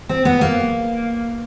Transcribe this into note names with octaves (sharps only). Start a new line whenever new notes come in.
C4
B3
A#3